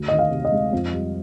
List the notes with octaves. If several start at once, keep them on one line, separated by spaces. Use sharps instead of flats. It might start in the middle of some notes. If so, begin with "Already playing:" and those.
Already playing: D2
D#3 D#5
F5
C3
D#5
G#3
F2
G3